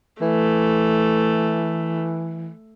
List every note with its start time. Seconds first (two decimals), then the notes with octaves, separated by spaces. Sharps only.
0.21 E3 A3